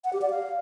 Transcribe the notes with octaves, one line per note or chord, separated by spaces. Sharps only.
F#5
G4
D5
F5